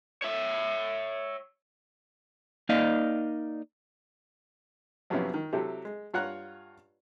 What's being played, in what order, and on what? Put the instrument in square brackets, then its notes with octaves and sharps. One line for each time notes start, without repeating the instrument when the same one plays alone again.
[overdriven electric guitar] C#5 E5
[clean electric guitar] A#3 D#4 D5 D#5 F5
[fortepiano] A#1 F#2 C3 B3 C#4 E4
D#3
C3 F#3 E4 G4 A4
G#3
G2 F4 C#5 F#5 A#5 F#6